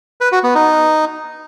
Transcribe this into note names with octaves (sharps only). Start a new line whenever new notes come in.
B4
F#4
B3
D#4